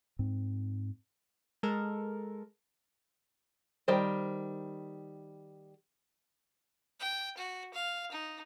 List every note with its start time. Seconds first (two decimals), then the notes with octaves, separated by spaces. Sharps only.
0.19 G#2 C4
1.63 G#3 A4 A#4
3.88 D#3 G3 C5
7.00 G5
7.37 F#4
7.74 F5
8.11 D#4